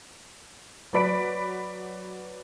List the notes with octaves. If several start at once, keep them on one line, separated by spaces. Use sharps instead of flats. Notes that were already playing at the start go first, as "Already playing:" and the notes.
F#3 B4 D5 B5 B6 D7